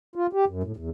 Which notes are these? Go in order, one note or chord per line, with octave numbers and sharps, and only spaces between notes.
F4
G4
F#2
A2
E2